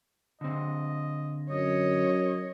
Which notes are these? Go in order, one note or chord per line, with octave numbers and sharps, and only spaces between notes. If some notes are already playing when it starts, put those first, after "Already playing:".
D3 C4 D#5
F#2 C#5 D#5